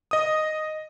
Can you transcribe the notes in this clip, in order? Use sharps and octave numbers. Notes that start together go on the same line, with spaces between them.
D#5 D#6